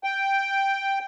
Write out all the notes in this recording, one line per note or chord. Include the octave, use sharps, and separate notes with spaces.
G5